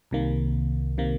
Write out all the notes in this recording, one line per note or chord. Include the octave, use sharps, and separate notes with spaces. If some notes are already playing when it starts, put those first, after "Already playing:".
C2 C3 D#3 A#3
C3 D#3 A#3